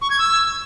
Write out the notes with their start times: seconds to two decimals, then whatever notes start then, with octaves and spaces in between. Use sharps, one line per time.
0.02 C#6
0.10 G#6
0.19 E6